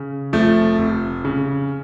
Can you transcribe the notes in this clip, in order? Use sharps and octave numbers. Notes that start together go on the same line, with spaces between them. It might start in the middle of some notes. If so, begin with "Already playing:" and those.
Already playing: C#3
F1 F3 A3
F1
C#3